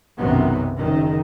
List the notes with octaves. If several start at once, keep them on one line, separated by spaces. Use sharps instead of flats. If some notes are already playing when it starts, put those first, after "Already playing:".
B1 F#2 C3 D#3 F#3 B3
F#1 D#3